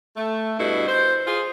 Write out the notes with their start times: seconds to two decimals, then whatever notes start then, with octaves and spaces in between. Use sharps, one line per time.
0.16 A3
0.58 G2 B2 E4
0.87 C5
1.26 F4 G#4